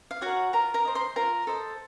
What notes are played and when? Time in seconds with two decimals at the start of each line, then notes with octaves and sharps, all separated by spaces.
0.11 F5
0.21 F#4 A#4 C#5 F#5
0.53 F4 A#4 A#5
0.74 A#4 A#5
0.85 C5 D#5
0.95 C5 C6
1.16 F4 A#4 A#5
1.47 A4 C5 D#5 A5